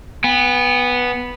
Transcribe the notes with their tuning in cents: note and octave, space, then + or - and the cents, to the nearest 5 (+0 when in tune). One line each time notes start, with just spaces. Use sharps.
B3 -5 G5 +45